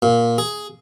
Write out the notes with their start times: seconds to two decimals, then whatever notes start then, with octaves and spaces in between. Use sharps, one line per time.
0.02 A#2
0.38 G#4